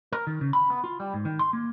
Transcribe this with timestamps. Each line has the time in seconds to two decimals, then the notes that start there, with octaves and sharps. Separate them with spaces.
0.12 A#4
0.27 D#3
0.41 C#3
0.53 B5
0.70 B3
0.84 F4
1.00 G3
1.14 G#2
1.25 D#3
1.39 C6
1.53 A#3